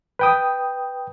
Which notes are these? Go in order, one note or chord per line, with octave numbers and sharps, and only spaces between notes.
B4 G5 D#6